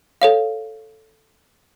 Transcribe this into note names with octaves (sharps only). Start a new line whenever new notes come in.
A4 C#5 F5